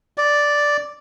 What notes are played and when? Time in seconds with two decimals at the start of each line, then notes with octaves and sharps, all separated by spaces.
0.18 D5